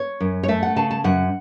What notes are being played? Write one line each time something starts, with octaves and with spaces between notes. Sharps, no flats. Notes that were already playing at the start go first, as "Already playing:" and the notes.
Already playing: C#5
F#2
C#5
A3 E5
F#5
C#3 A5
A5
F#2 F#5